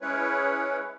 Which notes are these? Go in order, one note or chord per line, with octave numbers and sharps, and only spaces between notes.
G#3 C#4 E4 B4 C#5